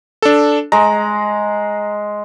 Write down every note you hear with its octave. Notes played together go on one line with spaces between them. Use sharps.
D4 A4
G#3 A#5